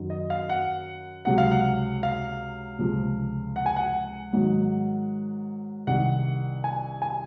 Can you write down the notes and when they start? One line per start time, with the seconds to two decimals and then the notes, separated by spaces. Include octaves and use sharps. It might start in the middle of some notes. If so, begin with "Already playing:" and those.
Already playing: F#2 D#3 F#3
0.10 D#5
0.30 F5
0.49 F#5
1.25 C#2 C3 F#3 F#5
1.38 F5
1.51 F#5
2.03 F5
2.79 C#2 C3 F3
3.56 F#5
3.66 G#5
3.76 F#5
4.33 G#2 D#3 F#3
5.87 C2 C3 D#3 F#5
6.64 G#5
7.02 G#5